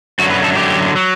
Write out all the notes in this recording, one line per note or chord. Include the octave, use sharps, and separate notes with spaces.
F#2 D3 F#3 F#4
B4
A4
F#2 D3 F#3 G4
F#3